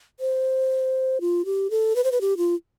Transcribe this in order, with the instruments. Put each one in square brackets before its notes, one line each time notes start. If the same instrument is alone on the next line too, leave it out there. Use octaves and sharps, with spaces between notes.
[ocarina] C5
F4
G4
A4
B4
C5
B4
G4
F4